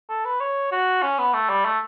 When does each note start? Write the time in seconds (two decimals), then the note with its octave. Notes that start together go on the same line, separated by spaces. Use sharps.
0.09 A4
0.25 B4
0.40 C#5
0.71 F#4
1.02 C#4
1.18 B3
1.33 A3
1.49 G3
1.65 A3